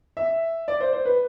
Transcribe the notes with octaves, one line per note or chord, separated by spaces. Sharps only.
E5
D5
C5
C5
B4